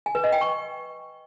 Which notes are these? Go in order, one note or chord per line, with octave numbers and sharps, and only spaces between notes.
G#5
B4
D#5
G5
C#6